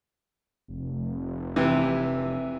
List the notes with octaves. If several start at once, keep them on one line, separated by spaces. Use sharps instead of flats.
F1
C3 E3